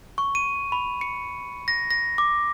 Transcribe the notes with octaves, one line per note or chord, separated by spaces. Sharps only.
C#6
D#7
B5
C#7
A#6
A#6
D6